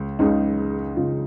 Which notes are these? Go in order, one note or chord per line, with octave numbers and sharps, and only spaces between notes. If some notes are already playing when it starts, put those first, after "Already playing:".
Already playing: C#2
C#2 C#3 G#3 D#4
C#2 C#3 G#3 F4